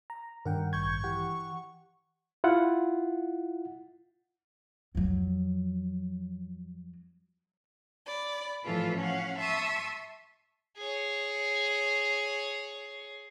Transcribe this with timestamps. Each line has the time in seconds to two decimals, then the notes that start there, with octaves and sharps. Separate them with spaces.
0.10 A#5
0.45 G2 D#3 D4 A#4 F#5 G5
0.73 A1 C#6 G6 G#6
1.04 E3 G4 F#5
2.44 E4 F4 F#5
4.95 F2 F#3
8.06 D5 B5
8.64 A2 E3 F3 F4 A4 B4
8.96 C#4 F5 F#5
9.38 E5 A5 C6 C#6 D#6 E6
10.77 G#4 C#5